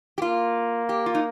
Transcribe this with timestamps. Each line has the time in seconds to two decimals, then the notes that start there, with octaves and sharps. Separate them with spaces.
0.18 G4
0.22 A#3 F4
0.89 G4
1.06 F4
1.14 D#4